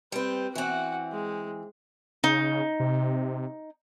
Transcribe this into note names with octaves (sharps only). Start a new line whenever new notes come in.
G3 C4 B4
E3 C4 F#4 F#5
G#3
C#3 D#4
C3